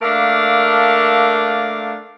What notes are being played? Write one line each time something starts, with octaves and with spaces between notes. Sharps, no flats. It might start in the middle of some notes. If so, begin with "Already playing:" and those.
A3 A#3 D4 A#4 F5